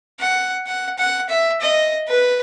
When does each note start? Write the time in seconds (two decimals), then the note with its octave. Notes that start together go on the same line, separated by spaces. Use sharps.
0.20 F#5
0.66 F#5
0.98 F#5
1.29 E5
1.61 D#5
2.08 B4